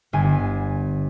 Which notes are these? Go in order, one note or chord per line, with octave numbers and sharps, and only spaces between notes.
G1 G#5